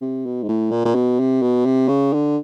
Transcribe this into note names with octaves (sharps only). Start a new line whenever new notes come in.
C3
B2
G#2
A2
A#2
A#2
B2
C3
B2
C3
C#3
D3